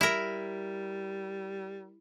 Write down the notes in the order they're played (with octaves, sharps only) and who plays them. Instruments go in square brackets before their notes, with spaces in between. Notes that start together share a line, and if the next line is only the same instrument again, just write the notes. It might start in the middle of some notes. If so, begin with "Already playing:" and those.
[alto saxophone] G3 [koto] E4 A#4